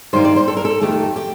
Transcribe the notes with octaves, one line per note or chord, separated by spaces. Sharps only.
G2 D#3 G3 A#3 C5
D5
C5
A4
A#4
A4
F2 D#3 A3 G4
G4